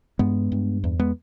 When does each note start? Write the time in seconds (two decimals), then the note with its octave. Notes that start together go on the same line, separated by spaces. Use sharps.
0.19 G2 G#3 B3
0.52 G2
0.84 E2
1.00 G#3 B3